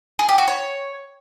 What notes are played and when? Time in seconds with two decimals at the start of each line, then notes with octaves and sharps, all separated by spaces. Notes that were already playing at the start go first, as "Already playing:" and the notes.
0.19 G#4
0.29 G4
0.38 F#4
0.48 C#5